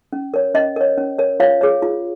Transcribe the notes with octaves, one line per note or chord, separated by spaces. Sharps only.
C#4
A#4 C#5
C#4 D#5
A#4 C#5
C#4
A#4 C#5
F4 C#5 F5
G#4 C#5
F4